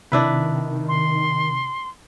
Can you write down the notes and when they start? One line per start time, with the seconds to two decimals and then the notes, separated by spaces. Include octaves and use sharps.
0.12 C3 D#3 D4 E4 B4
0.88 C6